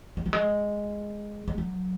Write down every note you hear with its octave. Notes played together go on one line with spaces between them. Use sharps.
G#3
F#3
G#3
G#3
F#3